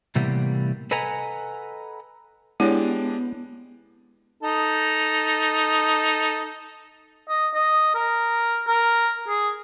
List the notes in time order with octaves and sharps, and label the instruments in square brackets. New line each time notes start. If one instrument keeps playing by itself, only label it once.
[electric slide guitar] A2 C3 E3 G3 A#3 B3
A4 B4 D#5 F#5 G#5 A#5
[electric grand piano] G#3 D4 G4 [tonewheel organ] B3 [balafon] E4 C#5
[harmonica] D#4 A4
[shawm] D#5
D#5
A#4
A#4
G#4